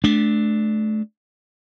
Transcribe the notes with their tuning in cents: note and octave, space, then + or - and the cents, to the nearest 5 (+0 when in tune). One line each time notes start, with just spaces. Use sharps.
A3 -30 D4 +0